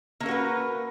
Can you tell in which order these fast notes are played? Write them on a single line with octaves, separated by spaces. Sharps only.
A#3 C#4 A#4 F#4 B4